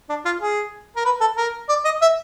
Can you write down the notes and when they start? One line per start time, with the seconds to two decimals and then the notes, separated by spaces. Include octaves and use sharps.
0.10 D4
0.25 F4
0.41 G#4
0.96 A#4
1.05 B4
1.21 A4
1.37 A#4
1.69 D5
1.85 D#5
2.02 E5